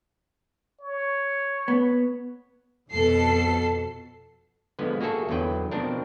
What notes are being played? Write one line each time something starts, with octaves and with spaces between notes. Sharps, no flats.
C#5
B3
F2 B2 A4 C7
D3 F3 G#3 B3
A#3 F#4 G#4 A4 E5
E2 D3 F#3 B4 G5
B2 F3 C4 D4 A#4